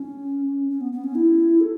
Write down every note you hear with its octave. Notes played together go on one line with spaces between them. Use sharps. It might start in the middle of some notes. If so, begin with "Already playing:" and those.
Already playing: C#4
C#4
B3
B3
C#4
E4
A4